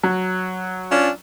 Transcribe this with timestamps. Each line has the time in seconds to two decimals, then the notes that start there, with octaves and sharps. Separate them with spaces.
0.03 F#3
0.91 C#4 D4 F4